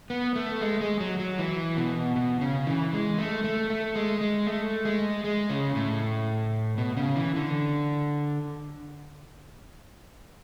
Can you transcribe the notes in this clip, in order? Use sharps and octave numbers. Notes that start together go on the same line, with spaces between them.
B3
A3
G#3
G#3
F#3
F#3
E3
B2
B2
C#3
E3
G#3
A3
A3
A3
G#3
G#3
A3
G#3
G#3
C#3
A2
B2
C#3
E3
D3